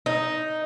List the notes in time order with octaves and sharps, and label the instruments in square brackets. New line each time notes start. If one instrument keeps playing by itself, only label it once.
[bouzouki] D#4